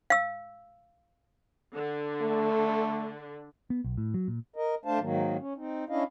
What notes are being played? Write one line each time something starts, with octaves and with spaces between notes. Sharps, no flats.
F5 E6
D3
A3
B3
B1
A2
F#3
A#2
A#4 D#5
A3 D4 C5 F5 A5
G#2 D#3 F#3 A#3
C#4
C4 D#4
C#4 D4 E4 D#5 F5